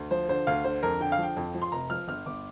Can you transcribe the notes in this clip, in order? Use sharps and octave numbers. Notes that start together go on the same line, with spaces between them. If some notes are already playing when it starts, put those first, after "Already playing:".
Already playing: D2
F3 C5
D3 C5
D2 F5
D3 C5
F2 A#4
D3 G5
F5
F3 G5
F2
F3
C6
F1 A#5
F3 F6
G1 F6
G1 D6